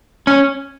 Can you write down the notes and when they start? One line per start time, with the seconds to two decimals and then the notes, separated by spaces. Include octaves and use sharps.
0.27 C#4